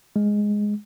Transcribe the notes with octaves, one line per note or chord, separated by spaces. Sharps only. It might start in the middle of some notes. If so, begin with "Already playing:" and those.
G#3